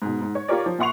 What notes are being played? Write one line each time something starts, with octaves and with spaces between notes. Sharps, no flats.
G#2 B2
G#2
C#5
F4 G4 A#4 C#5 D5
F3
A#2 E5 F#5 C6 C#6 F7